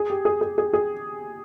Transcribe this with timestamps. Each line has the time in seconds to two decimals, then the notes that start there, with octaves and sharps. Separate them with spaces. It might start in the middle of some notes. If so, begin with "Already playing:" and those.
Already playing: G#4
0.10 G4
0.25 G#4
0.41 G#4
0.58 G#4
0.73 G#4